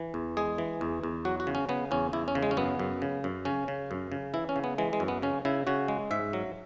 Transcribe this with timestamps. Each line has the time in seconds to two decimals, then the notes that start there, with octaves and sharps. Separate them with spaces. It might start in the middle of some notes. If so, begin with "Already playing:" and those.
Already playing: E3
0.14 E2
0.37 G#3 G#4
0.58 E3
0.81 E2
1.03 E2
1.25 F#3 F#4
1.40 F#4
1.47 C#3
1.55 C#4
1.69 C#3 B3
1.91 E2 C#4
2.13 E2 E4
2.28 C#4
2.35 C#3
2.43 G#3
2.51 C#4
2.57 F#2 B3
2.79 F#2
3.02 C#3
3.24 F#2
3.45 C#3 C#4
3.68 C#3
3.91 F#2
4.12 C#3
4.34 E3 E4
4.49 C#4
4.56 C#3
4.64 B3
4.78 E3 G#3
4.93 G#3
5.00 F#2
5.08 B3
5.22 C#3 C#4
5.45 C#3 E4
5.67 C#3 F#4
5.88 G#3
6.11 G#2 E5
6.33 F#3